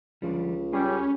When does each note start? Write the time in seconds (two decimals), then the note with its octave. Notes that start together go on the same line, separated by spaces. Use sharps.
0.22 C#2 D3 F3 G3
0.73 G3 C#4 G#4 A4